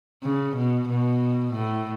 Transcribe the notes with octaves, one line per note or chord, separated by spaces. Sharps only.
C#3
B2
B2
A2